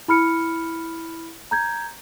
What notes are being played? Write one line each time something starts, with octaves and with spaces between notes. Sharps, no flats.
E4 B5 F6 C#7
A#5 G6 G#6